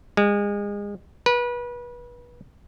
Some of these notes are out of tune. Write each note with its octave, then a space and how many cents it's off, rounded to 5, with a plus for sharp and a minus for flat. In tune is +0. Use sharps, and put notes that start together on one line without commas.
G#3 -30
B4 -30